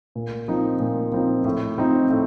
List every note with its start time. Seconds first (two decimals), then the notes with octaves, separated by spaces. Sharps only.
0.15 A#2
0.48 F3 C4 D#4
0.80 A#2
1.12 F3 C4 D#4
1.44 A2
1.78 F3 C4 D#4
2.10 A2